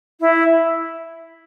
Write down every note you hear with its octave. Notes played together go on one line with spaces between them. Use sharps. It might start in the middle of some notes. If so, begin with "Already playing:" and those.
E4